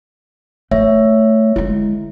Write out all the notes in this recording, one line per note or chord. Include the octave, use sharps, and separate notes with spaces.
A3 C#5 E5
D3 G#3 E4